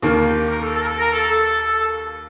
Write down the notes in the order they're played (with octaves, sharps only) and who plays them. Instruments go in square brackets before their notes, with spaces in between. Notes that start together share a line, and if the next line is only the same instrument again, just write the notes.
[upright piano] D#2 D#3 A#3 [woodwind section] F4
[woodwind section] G4
A#4
A4
A4
A#4
A4
A#4
A4
A4